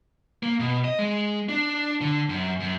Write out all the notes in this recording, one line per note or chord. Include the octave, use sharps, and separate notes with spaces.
A#3
B2
D#5
G#3
D4
D3
F#2
F#2